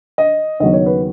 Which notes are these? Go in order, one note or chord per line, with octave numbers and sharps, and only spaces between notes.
D#5
D#2 C#3 F#3 B3 D#5
C#5
B4